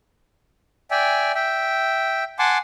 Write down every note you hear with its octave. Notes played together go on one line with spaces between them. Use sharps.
D5 E5 G5 G#5
E5 G5
F#5 G#5 A5 C6 D6